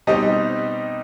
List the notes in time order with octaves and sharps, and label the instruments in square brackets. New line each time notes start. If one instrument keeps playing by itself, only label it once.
[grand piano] B2 G3 C4 D#4 G4 [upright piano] D#5